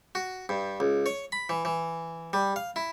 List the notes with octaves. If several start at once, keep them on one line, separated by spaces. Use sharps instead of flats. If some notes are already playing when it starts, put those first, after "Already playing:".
F#4
G2
C#2
C#5
B5
E3
E3
G3
F5
E4